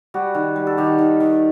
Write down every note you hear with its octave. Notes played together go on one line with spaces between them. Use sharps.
G3 F#4
D#3
G3
A4
D#3 G4
D#3
D#3